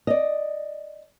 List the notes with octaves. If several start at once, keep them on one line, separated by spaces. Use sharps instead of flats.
D5 D#5